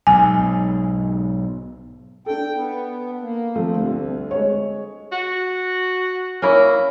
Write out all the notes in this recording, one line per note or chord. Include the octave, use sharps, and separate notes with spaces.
B1 G#2 G#5
D4 A4 G5
B3
A#3
D2 F3 A3 C4
C2
G#3 C#5
F#4
A#3 C#4 E4